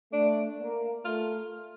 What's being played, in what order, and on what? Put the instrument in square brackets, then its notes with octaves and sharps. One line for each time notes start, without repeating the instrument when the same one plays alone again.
[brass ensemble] A3 [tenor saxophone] D4
[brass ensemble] A#3
[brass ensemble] A3 [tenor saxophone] F4